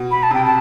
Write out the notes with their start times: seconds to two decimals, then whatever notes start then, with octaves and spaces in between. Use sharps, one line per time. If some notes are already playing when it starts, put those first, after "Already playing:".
Already playing: B2
0.11 B5
0.23 A5
0.31 C3 G5
0.45 A5